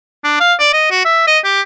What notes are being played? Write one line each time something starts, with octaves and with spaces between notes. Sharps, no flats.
D4
F5
D5
D#5
F#4
E5
D#5
G4